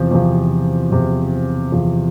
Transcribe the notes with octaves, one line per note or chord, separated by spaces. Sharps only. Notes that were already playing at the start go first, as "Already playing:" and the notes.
Already playing: E2 C3 F3
E2 C3 F3
E2 C3 F3
E2 C3 F3